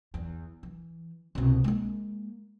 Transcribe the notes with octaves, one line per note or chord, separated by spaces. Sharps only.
E2
E3
C2 B2
G#3 A#3